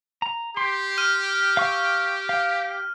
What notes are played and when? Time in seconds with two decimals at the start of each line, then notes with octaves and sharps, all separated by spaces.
0.22 A#5
0.57 G4 C6
0.98 F6 D#7
1.57 F5 C#6 E6
2.29 F5